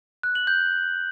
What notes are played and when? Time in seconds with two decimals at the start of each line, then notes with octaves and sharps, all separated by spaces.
0.23 F#6
0.35 F#7
0.47 G6